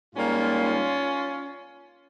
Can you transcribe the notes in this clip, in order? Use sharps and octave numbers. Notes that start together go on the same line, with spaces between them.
G#2 G3 A#3 C#4 F4